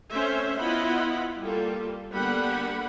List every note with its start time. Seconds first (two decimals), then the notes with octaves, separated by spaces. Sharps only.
0.12 A3 C4 C#4 C5 C#5 E5
0.57 B3 E4 F4 D#5 F#5 B5
1.40 G3 A#3 F4 A4
2.13 D3 G3 A#3 B3 F#5 B5